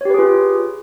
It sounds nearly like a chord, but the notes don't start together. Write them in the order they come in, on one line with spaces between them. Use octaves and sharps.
C#5 G4 B4 G#4 F4